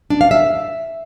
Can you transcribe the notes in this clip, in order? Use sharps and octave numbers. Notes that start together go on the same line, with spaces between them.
D4
F5
E5